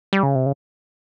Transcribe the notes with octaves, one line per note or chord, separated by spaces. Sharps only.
G3
C#3
C3
C#3